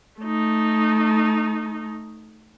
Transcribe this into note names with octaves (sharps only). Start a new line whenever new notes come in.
A3 D#4